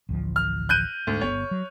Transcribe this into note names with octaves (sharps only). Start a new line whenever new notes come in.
A1 D2 F3
F6
F#6 G6 D#7
D2 G#2
G1 B3 C#5
F#3